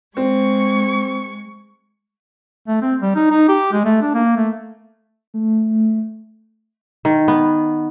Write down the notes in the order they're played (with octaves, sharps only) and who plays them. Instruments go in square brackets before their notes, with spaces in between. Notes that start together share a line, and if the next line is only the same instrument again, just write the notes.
[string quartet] G#3 C#6 [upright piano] C4
[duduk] A3
C4
G3
D#4
D#4
G4
G#3
A3
D4
A#3
A3
[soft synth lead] A3
[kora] D#3
B3